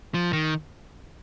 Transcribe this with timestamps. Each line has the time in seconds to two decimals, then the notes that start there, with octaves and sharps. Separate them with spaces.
0.14 F3
0.33 D#3